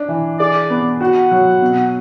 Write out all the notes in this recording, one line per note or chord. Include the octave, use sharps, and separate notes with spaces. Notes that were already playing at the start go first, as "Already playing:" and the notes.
Already playing: D4
E3
G#4 D5
B3
F#4 F#5
F#3
B2